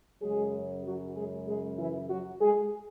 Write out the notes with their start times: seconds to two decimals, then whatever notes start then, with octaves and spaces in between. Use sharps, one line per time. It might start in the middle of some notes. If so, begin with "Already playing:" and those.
0.22 F#2 C#3 F#3 G#3 G#4
0.85 F#3 F#4
1.16 G#3 G#4
1.47 G#3 G#4
1.78 E3 E4
2.10 F#3 F#4
2.41 G#3 G#4